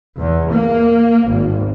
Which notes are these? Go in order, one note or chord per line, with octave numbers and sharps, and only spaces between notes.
E2
A#3
G#1